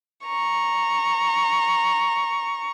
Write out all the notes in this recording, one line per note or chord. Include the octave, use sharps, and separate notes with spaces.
A#5 C#6